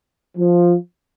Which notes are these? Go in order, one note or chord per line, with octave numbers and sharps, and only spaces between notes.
F3